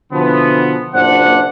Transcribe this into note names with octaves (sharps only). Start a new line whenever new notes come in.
B2 D3 E3 F3 B3
F#1 A#2 D4 C5 F#5